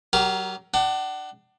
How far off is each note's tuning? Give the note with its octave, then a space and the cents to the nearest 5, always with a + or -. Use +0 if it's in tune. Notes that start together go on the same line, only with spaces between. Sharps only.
F#3 +30 G4 +0 A#4 +0
D4 +20 F#5 +40